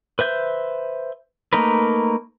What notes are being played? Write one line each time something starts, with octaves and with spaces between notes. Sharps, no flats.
B4 C5 E5 G6
A3 A#3 D#4 A#4 B4